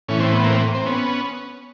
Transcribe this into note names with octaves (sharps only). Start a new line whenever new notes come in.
A2 E3 C#4
C4
B3
A#3 C4
C4
B3 C#4